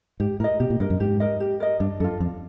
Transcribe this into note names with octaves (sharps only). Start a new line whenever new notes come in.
G#2 G4
A2 A#4 D#5
B2 G4
A#2
G2 A#4 D#5
F#2
G#2 G4
A#4 D#5
G4
A#4 D#5
G2 D4
F#2 F4 A4
F2 D4